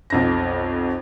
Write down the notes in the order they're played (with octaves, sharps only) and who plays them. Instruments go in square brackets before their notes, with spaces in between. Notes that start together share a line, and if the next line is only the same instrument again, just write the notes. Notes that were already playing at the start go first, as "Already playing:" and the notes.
[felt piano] B1 F2 A#6